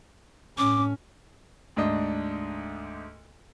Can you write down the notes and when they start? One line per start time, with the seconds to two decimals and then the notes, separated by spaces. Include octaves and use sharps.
0.58 A2 C#4 D6
1.76 D2 G#2 D4 D#5